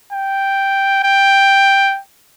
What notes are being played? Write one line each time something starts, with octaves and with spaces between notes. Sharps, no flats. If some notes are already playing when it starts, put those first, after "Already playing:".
G5
G5